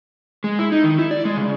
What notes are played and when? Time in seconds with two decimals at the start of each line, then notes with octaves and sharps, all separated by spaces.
0.44 G#3
0.59 E4
0.72 D#4
0.84 D#3
0.99 E4
1.11 D5
1.25 G#3
1.37 C#3